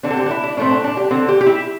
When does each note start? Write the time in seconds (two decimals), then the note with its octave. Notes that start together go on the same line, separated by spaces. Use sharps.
0.03 D3 C4 D4
0.10 A4
0.17 G4
0.26 D4
0.31 E4
0.44 D4
0.57 A2 A3 C4 D4
0.71 D4
0.84 D4
0.97 G4
1.11 D3 C4 A4
1.29 G4
1.41 G4
1.46 E4